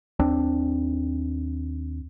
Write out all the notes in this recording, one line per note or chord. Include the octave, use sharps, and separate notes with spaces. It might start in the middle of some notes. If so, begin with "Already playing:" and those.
D#2 C4 D4